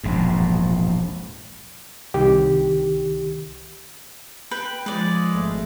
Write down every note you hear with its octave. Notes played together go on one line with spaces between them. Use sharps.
E1 A#1 G#2
C2 D#3 G4
B4 G5
F3 G#3 B4 D5
G#1 A3